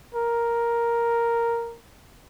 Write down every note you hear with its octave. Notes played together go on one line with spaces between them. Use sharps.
A#4